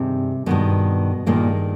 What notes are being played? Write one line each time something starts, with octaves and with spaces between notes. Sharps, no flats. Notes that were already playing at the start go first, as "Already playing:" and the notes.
Already playing: G2 C3 D#3 G#3 C4
G2 B2 D#3 G#3 B3
G2 A#2 D#3 G#3 A#3